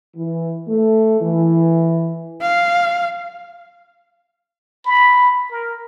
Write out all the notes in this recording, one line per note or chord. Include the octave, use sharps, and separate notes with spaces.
E3
A3
E3
F5
B5
A#4